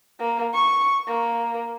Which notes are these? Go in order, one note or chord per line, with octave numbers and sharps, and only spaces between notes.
A#3
C#6
A#3